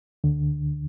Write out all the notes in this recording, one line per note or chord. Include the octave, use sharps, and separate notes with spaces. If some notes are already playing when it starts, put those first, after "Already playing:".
D2 D3